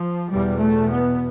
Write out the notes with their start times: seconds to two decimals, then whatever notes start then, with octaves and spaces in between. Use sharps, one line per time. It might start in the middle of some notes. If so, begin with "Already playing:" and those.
Already playing: F3
0.29 E2 B2 G3
0.59 A3
0.89 B3